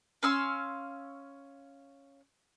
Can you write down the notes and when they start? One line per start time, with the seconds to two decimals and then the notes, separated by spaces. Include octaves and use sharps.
0.23 C#4 F5 C6 E6